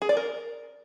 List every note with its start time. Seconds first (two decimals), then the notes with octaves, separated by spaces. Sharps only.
0.02 G#4
0.09 D5
0.17 A#4